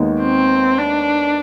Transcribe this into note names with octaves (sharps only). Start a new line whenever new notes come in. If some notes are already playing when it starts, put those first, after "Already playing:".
Already playing: D#2 D#3 G#3 B3 D#4
C4
D4